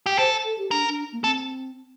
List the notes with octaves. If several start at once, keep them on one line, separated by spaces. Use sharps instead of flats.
G4
A4 C5
A4
G4
D4 A#4
D4
A#3
C4 A4